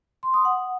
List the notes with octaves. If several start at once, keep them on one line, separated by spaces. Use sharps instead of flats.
C6
D#6
F#5